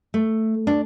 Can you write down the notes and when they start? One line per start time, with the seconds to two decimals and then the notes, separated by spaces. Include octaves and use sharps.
0.14 A3
0.67 D4